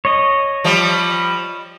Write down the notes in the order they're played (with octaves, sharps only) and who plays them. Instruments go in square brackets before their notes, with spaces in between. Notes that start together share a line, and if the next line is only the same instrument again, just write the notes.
[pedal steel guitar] C#5 D#5
[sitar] F3 G3